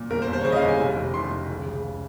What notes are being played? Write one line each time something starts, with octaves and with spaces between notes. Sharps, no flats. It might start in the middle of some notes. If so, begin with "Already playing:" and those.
Already playing: A#2
G1 A#4
C5
G1
C5
C#5
C#3 C5
D#5
F5
G1
G#5
F1
F1
D#3 C6
F1
C#2
C#3
C#3